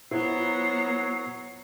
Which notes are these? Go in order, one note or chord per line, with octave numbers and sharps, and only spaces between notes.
F#3 B3 E4 F4 C5 A#5 C7